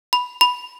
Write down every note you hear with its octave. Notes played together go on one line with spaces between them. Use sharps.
B5
B5